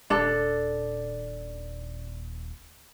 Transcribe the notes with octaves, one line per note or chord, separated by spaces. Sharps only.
D#1 D4 A4